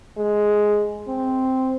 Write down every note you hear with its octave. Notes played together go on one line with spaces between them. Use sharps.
G#3
C4